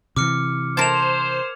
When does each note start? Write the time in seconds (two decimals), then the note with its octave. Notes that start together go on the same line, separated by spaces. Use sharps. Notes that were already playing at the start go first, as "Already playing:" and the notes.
0.16 C3 E3 D6 F6 C#7
0.77 A#4 C5 A5 G#6 F7